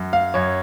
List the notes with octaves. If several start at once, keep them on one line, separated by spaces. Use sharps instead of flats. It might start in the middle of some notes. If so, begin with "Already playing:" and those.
Already playing: F#2
F5
F#2 C#5